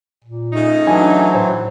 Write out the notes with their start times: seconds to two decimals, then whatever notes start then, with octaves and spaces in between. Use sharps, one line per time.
0.24 A#2
0.53 C#3 A3 D#4
0.87 E3 F#3 D4 G#5
1.34 A2 C5